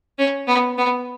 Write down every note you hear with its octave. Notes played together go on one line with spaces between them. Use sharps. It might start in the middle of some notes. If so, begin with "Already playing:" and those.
C#4
B3
B3